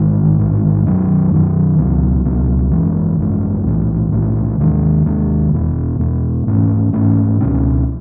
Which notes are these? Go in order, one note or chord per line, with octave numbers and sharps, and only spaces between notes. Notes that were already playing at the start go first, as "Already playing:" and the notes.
Already playing: A1 G#2 D#3 G#3
A1 G#2 D#3 G#3
F#2 D#3 F#3
F#2 D#3 F#3
C#2 B2 F#3 B3
C#2 B2 F#3 B3
G#1 F#2 E3 G#3
G#1 F#2 E3 G#3
B1 A2 E3
B1 A2 E3
D#2 D#3 G#3
D#2 D#3 G#3
E2 B2 G#3 B3
E2 B2 G#3 B3
G#2 E3 A3 C#4
G#2 E3 A3 C#4
C#2 B2 A3 C#4